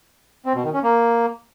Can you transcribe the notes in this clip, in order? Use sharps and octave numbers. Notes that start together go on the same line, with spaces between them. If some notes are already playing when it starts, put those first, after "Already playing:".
C4
B2
D#3
C#4
A#3